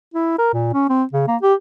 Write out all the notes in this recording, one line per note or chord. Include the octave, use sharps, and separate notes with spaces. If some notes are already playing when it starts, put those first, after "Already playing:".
E4
A#4
A#2
C#4
C4
C#3
A#3
G4